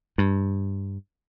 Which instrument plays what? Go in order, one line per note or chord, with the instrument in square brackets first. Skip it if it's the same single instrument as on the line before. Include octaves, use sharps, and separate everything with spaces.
[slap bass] G2